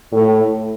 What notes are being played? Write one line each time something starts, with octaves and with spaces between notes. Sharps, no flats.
A2